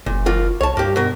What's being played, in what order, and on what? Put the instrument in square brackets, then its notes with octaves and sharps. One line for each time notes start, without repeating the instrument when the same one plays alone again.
[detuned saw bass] F#1 [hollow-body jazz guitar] A#2
[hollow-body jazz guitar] D#2 A#3 F4
[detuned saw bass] C2 [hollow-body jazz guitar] C#5 A5
[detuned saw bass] G2 [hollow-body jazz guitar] A#3 G4
[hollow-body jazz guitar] B2 A#4